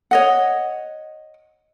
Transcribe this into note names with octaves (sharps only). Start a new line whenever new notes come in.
C#5 D#5 F#5